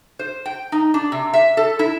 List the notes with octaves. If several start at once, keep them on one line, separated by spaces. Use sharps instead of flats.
C5
G5
D#4
D4
C3
E5
A4
E4